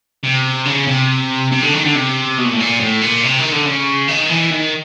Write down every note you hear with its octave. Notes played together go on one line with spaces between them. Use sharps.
C3
C#3
C3
C3
D3
D#3
D3
C3
B2
A#2
A2
A#2
A2
A#2
C3
D#3
D3
C#3
D#3
E3
D#3